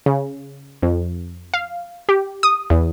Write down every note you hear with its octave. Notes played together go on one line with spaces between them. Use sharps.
C#3
F2
F5
G4
D#6
E2